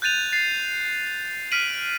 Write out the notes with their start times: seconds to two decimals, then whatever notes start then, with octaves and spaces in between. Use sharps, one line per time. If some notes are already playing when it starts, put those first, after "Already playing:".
0.02 F#6 G6 A6 D#7 F7
0.32 A6 C7
1.51 F6 B6 D7 D#7 F#7